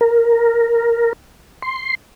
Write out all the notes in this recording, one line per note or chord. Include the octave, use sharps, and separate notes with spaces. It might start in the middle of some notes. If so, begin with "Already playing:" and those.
A#4
C6